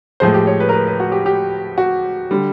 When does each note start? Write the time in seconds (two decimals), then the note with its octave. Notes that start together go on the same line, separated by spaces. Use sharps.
0.20 A2 F3 G#3 C5
0.34 G4
0.47 C#5
0.60 B4
0.69 A#4
0.72 B4
0.87 B4
1.00 F#4
1.12 G4
1.26 G4
1.78 F#4
2.31 D3 G3